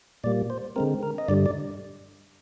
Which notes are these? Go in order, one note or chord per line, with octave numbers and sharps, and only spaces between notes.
A#2 G3 A#3 D5
C5
D3 G#3 C4 A#4
A#4
D#5
G2 D3 G3 D5
D5